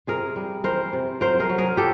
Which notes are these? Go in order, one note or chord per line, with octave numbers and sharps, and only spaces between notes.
C3 G#4 A#4
G3
E3 A#4 C5
C3
F#3 A#4 C5
G#4 A#4
F#3
G#4 A#4
F#3 G4 A4